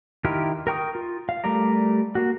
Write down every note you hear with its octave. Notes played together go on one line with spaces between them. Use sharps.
D#3 E4 F4 G4 A#4
A#4 G5 C#6 D#6
F4
F5
G3 A3 A#4 D5 A#5
A#3 F#4